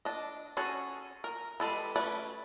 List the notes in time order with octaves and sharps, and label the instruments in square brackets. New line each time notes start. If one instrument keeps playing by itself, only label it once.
[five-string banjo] D4 D#5
C#4 F#4 G#4 A4
A#4
G3 G#3 A4 B4
A3 C#4 B4 D5